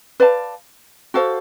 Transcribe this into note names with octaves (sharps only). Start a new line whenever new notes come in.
B4 D5 F5 A5
F#4 A4 C5 F5